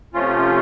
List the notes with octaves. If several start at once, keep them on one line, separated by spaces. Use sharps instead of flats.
C3 F3 A3 C#4 F4